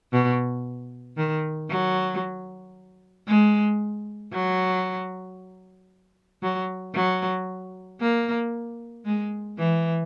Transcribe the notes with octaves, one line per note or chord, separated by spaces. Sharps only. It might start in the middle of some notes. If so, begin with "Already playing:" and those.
B2
D#3
F#3
G#3
F#3
F#3
F#3
A#3
G#3
E3